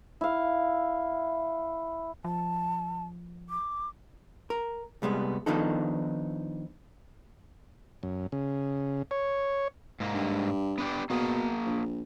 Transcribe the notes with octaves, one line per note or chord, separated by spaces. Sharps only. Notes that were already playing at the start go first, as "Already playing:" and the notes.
E4 F5
F3 A5
D6
A#4
C2 G3 G#3 B3
D#3 F3 B3 D4 D#4 A4
F#2
C#3
C#5
G#2 A#3
G2
B3 D4 G4
B2 A#3 G#4
A#1